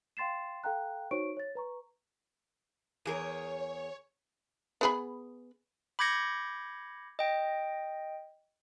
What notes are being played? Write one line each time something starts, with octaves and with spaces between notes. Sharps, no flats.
F5 G5 C6 A6 C7 E7
A4 F5 G5 A#5 F#6
D#4 F#4 C5 C#5 C#6 D7
C#5 A6
B4 A#5 C#6
E2 G#4 A#4 C#5
B3 G#4 B5
B5 D6 G6 G#6 A#6 C#7
D#5 G5